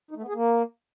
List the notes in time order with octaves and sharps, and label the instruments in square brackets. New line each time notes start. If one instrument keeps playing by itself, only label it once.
[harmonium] D#4
A3
B3
G#4
A#3